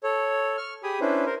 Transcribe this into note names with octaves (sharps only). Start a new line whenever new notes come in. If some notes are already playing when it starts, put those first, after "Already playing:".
A4 C#5
C#6 F6
G4 G#4 G#5 B5 D#6
C#4 D4 E4 B4 C5
A#4 C5